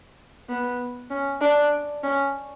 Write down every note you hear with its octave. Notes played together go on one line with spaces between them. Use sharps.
B3
C#4
D4
C#4